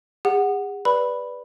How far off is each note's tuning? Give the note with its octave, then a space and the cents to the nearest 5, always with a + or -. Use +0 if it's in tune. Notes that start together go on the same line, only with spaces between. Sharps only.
G#4 -40 F#5 +0
B4 +0 D5 +0 B5 +0